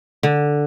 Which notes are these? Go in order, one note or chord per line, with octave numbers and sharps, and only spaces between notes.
D3